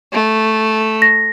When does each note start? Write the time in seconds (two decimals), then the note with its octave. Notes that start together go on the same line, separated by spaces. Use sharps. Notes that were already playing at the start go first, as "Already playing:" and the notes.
0.13 A3
1.02 A#6